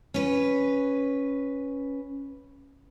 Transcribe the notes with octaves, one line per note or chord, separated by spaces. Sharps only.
C#4 B4